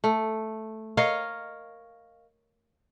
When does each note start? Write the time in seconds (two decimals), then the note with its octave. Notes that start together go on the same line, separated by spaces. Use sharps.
0.04 A3
0.97 A#4 C#5 D#5 F5